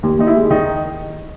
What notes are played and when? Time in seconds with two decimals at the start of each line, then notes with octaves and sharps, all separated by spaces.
0.03 D#2
0.19 D#2 D#4
0.27 E4
0.35 G#3
0.50 D#3 D#4